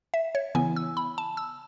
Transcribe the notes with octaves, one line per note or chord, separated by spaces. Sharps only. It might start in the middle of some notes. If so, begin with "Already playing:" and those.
E5
C#5
C#3 E3 B3 E4 G#5
E6
B5
A5
E6